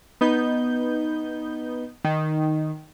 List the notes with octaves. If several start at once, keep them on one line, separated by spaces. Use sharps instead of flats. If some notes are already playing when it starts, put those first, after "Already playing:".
B3 D#4 G6
D#3